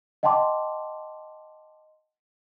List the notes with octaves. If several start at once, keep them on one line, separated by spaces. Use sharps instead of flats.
D#5 F#5 G5 A5 C6 D6